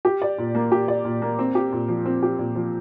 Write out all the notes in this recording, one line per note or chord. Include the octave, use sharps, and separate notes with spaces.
G4
D5
A#2
A#3
G4
D5
A#2
A#3
C4
G4
A#2
F3
C4
G4
A#2
F3